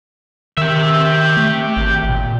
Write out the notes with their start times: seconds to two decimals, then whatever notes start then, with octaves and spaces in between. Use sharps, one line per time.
0.57 D#3 G4 E5
1.37 A3
1.77 G#1
2.09 A#2